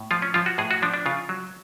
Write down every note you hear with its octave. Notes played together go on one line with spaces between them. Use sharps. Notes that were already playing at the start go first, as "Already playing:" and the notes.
Already playing: A2
F3 F4
C#4
F3 F4
F#4
A2 G#4
F#4
F3 D4
D4
C#3 F4
F#3